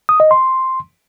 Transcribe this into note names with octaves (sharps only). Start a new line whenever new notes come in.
D#6
D#5
C6